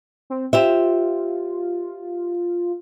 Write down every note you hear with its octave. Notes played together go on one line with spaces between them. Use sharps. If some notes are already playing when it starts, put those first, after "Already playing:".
C4
F4 G4 C5 E5